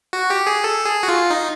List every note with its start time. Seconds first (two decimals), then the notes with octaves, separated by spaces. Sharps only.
0.13 F#4
0.30 G4
0.47 G#4
0.64 A4
0.85 G#4
1.03 F#4
1.08 F4
1.30 D#4